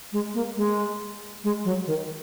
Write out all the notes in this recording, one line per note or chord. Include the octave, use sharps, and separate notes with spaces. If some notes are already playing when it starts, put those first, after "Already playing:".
G#3
A#3
G#3
G#3
F#3
D#3